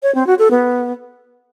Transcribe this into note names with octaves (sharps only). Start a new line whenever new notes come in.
C#5
C4
F#4
A4
B3